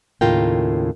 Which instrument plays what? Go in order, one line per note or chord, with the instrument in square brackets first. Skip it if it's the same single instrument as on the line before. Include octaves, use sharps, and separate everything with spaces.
[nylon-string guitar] D#2 A2 C#3 F4 A#4 G5